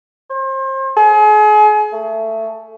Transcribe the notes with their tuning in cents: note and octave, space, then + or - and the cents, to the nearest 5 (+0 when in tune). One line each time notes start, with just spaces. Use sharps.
C5 +35
G#4 +35
A3 +15